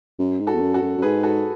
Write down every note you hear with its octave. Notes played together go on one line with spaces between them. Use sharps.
F#2
G#2
F#4 A4
E2
F#2
F#4 A4
F#2
F#2
G#2 G#4 B4
F#4 A4